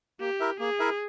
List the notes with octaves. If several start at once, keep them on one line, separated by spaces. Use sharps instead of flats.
A#3 G4
E4 A#4 E5
A#3 G#4
E4 A#4 E5